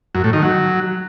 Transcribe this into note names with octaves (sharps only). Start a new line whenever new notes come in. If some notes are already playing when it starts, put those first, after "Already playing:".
F#2
A2
D#3
F#3